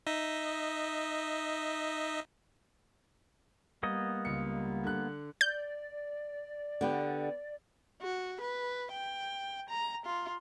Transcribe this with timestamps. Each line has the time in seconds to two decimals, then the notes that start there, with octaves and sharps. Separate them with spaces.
0.06 D#4 D#5 E5
3.83 G3 A#3 B3 D#5
4.25 C#2 C#7
4.84 D3 F#6
5.41 D5 G6
6.81 D3 B3 G4
8.03 F#4
8.41 B4
8.92 G5
9.69 A#5
10.06 F4